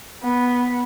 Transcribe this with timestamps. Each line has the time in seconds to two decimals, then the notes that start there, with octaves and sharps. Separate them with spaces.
0.24 B3